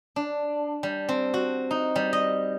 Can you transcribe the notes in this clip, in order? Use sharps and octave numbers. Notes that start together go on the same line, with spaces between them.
D4
G3
C4
F#4
D#4
G3
D#5